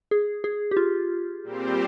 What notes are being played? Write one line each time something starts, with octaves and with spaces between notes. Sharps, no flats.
G#4
G#4
G4
F4
A#2 G3 C4 G4 C5